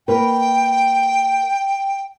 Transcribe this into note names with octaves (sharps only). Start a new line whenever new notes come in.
A#3 A#4 B4 G5